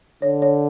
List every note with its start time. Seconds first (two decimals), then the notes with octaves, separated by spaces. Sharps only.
0.22 D3 C#5
0.42 C#5